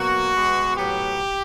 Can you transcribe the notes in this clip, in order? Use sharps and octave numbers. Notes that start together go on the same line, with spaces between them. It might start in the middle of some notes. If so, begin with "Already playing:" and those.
Already playing: B2 F#3 A#3 F#4
B2 G#3 B3
A2 F#3 B3 G4